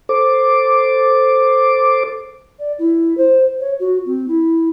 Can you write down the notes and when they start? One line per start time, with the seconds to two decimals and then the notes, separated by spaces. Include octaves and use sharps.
0.09 A4 C5 D6
2.59 D5
2.78 E4
3.17 C5
3.60 C#5
3.79 F#4
4.05 C4
4.28 E4